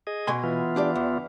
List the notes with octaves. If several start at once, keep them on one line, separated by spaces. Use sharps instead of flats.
G#4 D#5
B2 G#5 C6
E3 B3 F4
D4 G4 D5
E2